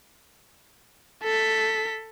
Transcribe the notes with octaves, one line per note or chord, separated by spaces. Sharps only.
A4 B6